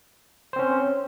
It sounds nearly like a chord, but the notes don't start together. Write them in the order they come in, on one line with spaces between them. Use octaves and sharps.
C5 C4 C#4